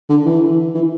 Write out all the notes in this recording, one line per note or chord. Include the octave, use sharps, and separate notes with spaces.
D3
E3
E3